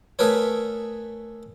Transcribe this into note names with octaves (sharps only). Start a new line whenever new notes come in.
A3 G#4 A#4 B4 C#5